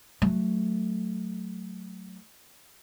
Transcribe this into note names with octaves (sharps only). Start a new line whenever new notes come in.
F#3 A3